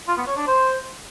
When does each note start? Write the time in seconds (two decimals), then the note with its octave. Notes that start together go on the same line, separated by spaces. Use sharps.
0.07 F4
0.17 B3
0.27 C#5
0.37 D4
0.46 C5